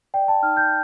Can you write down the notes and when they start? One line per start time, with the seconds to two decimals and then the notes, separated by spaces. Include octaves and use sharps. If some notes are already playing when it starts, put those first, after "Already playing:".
0.14 D5 G5
0.28 A5
0.43 D#4 F6
0.57 G6